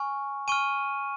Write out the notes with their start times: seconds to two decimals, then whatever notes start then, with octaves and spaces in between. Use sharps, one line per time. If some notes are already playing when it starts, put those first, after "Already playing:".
Already playing: G#5 C#6 F6
0.48 G#5 C#6 F6 D#7